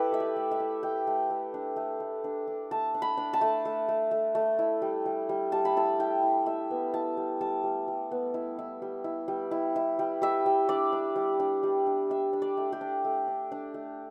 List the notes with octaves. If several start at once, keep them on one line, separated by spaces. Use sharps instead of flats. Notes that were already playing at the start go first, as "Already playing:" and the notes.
Already playing: E4 G4 A4 B4
A3 E5
D5
A3
E5
E4
A3 G5
A3
A3
D4
A3
A3
D4
D4
A3 A5
D4
B5
D4
A5
A3
A3
A3
A3
A3
E4
G3
G3
G3
G3 A5
B5
E4 A5
E4 G5
E4
E4 E5
B3
E4 A5
G3
G3 A5
G3
G3
B3
E4
E4
G3
E4
G3
E4
E4
G3
G3 E5
G3
D4 D5
D4
G3
D4
G3
D4
D4 E5
D4
D5
A3
G4
D4
A3
D4
D4
A3